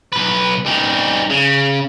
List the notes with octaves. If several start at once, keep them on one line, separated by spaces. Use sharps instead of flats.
B1 B4
G3 D#4
C#3